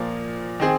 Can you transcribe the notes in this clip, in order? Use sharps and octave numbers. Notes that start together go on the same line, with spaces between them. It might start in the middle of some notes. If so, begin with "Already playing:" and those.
Already playing: A#2 F3 A#3
D#3 C4 G#4